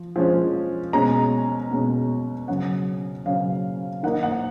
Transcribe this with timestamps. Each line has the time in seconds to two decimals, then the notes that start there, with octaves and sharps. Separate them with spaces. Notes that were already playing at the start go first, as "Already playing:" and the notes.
Already playing: F3
0.16 F3 G#3 C#4
0.93 B2 G#3 C#4 A#5
1.72 B2 G#3 C#4
2.48 C#3 F#3 C#4 F#5
3.26 C#3 F#3 C#4 F5
4.03 D#3 A#3 D#4 F#5
4.23 F#5